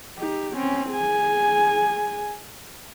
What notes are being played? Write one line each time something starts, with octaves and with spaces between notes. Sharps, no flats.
D#4 G4
C4 C#4
G#4 G#5